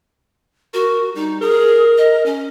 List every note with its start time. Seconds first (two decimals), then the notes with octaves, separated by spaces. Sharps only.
0.74 F#4 A#4
1.15 G3 D#4
1.41 G#4 A#4
1.97 D#5
2.26 C#4